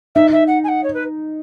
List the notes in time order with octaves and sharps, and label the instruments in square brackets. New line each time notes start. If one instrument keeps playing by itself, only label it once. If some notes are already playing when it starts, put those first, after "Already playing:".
[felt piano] D#4 [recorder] E5
[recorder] E5
F#5
G#5
F#5
C#5
B4